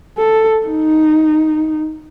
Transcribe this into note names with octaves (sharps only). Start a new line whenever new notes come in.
A4
D#4